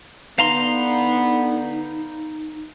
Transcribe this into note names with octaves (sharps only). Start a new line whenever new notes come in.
D3 B3 D#4 F5 A#5 C6